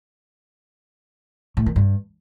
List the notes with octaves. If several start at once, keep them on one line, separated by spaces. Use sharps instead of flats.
A2
D#3
G2